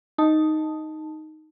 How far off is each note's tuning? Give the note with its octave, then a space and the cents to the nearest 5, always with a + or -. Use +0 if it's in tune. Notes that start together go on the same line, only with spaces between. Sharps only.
D#4 +0 A5 +0